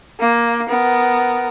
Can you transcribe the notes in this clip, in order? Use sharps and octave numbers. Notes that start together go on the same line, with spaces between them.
A#3
B3 A#4